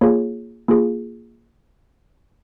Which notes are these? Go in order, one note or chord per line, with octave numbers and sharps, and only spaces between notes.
A#3 F4 G#4 C#5
A#3 F4 G#4